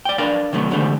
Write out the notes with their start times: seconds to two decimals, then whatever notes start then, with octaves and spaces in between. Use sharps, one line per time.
0.05 D5 G5
0.18 D4 A#4 B4 D5 F5
0.53 C3 D#3 F#3 A3 B3
0.71 E2 G#2 D3 F3 G3 A3